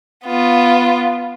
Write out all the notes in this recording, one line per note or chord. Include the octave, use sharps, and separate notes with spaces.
B3 F4